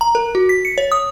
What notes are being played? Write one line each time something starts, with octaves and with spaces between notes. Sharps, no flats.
A#5
A#4
F#4
B6
C#7
C#5
D#6